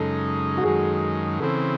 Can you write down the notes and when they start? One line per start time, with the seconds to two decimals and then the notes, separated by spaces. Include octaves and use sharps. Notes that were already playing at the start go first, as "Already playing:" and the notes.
Already playing: F#2 C#3 G#3 D#4 A4
0.57 F#4
0.64 F#2 D#3 G#3 G#4
1.40 C#3 E3 C4 A4